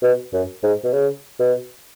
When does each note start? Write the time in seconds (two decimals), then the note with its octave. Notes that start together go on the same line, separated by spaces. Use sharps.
0.03 B2
0.33 F#2
0.63 G#2
0.84 B2
0.93 C#3
1.39 B2